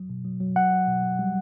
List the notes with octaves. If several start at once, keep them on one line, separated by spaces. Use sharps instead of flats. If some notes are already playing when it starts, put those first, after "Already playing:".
Already playing: F#3
B2
F#3
F#3
F#3 F#5
F#3
B2
F#3
G3